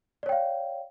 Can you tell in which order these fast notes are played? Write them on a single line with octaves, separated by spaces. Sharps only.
D5 C#5 G5 F5